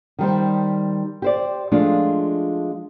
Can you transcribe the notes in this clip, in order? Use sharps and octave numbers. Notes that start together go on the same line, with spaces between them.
D#3 G3 C5
G4 C5 D5
F3 G#3 A3 D4 F4